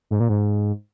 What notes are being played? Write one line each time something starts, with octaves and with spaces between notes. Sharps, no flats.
G#2
A#2
G#2